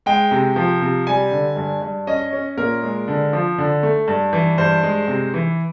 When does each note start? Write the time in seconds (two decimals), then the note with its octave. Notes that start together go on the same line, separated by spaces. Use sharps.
0.06 G#3 G5
0.31 C3
0.56 F3
0.82 C3
1.07 G3 G#5
1.32 D3
1.56 G2
1.82 G2
2.07 C#4 D#5
2.33 C#4
2.57 A#2 A#4
2.82 G#3
3.08 D3
3.33 F3
3.58 D3
3.83 A3
4.08 G2
4.33 E3
4.58 G2 C5
4.83 G#3
5.08 C3
5.34 E3